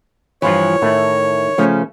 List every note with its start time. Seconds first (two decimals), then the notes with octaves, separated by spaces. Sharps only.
0.42 G2 E3 F3 F4 B4 C#5
0.82 A2 D#3 A3 E4
1.58 C#3 F3 A3 C#4